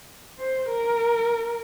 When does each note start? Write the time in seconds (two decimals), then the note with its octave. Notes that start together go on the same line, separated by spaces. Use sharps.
0.39 C5
0.69 A#4